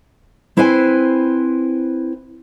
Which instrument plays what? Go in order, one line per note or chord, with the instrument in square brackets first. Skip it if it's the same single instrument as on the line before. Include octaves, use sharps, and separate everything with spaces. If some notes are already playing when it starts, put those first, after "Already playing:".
[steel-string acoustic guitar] C4 E4 B4 C5 G#5